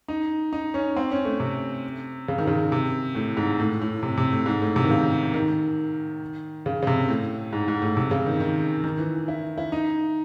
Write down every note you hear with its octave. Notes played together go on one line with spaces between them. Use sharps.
D#4
D#4
C#4
C4
C#4
A3
C3
C#3
D#3
C#3
C3
A2
G#2
A2
A2
C3
C3
A2
G#2
A2
C3
D#3
C#3
D#3
C#3
C#3
C3
A2
G#2
G#2
A2
C3
C#3
D#3
D#3
D#3
E3
E4
E4
D#4